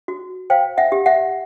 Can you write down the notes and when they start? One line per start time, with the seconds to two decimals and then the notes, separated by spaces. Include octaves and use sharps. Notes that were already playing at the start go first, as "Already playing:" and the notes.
0.08 F#4
0.50 C5 F5 G5
0.78 E5 F#5
0.92 G4
1.06 E5 F#5